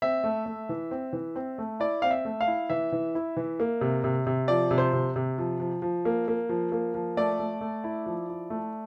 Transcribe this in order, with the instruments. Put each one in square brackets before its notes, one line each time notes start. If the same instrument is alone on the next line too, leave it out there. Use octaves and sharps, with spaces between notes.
[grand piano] C4 E5
A3
A3
E3
C4
E3
C4
A3
E4 D5
C4 F5
E5
A3
F5
E4
E3 E5
E3
E4
E3
A#3
C3
C3
C3
F3 D5
C3
C5
C3
C3
F3
F3
F3
A#3
A#3
F3
A#3
F3
A3 D5
A3
A3
E4
F3
E4
A3